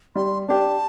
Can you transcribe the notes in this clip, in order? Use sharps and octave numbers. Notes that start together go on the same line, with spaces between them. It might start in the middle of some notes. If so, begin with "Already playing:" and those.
G3 C6
D4 G4 A5